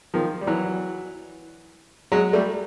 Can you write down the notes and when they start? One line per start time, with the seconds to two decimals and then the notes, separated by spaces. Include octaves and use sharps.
0.14 D#3 F3
0.41 G3
0.47 E3 F#3
2.12 F#3 G#3
2.33 G3 A3